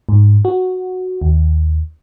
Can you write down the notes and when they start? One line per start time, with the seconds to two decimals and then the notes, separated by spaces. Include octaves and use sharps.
0.09 G#2
0.45 F#4
1.22 D#2